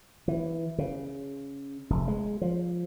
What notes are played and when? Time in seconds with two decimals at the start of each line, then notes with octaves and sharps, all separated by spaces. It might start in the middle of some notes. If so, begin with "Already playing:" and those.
0.28 E3
0.78 C#3
1.90 F1
2.08 G#3
2.41 F3